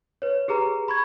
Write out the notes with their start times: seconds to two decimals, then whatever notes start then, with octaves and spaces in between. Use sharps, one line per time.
0.22 B4 C#5
0.48 G4 G#4 B4 A#5
0.88 B5 C#6 G#6